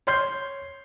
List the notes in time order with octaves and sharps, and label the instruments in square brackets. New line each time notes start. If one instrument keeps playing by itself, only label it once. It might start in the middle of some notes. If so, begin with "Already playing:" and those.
[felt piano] C#5 C6 G6 C7